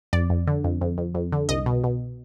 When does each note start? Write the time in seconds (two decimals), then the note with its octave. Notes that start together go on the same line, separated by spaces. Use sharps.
0.13 F2 D5
0.30 F2
0.47 D3
0.64 F2
0.81 F2
0.98 F2
1.15 F2
1.32 D3
1.49 C2 D#5
1.66 B2
1.84 B2